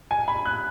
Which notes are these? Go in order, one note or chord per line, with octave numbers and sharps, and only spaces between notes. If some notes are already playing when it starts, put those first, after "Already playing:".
G#5
B5
F#6